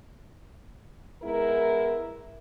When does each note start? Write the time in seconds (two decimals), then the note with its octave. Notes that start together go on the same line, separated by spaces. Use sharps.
1.22 G#3 B3 E4 A#4